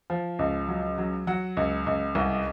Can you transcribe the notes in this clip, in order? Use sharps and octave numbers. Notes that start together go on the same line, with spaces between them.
F3
C#2
F#3
F#3
F#3 F#5
C#2
C#2
C2